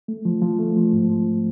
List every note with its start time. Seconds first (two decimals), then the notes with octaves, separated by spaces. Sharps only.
0.08 A3
0.25 F3
0.42 F3
0.59 A3
0.76 F3
0.93 G#2
1.10 F3